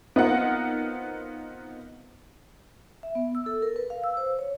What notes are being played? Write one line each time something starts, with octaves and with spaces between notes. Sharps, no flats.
B3 C4 D#4 F4 A#4 F#5
E5
B3
E6
A4
A#4
B4
F5
E6
C5
C#5